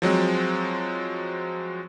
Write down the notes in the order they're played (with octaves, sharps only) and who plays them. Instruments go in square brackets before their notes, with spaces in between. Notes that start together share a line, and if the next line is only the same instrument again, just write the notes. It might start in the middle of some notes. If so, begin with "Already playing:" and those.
[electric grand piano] F3 F#3 G#3 C4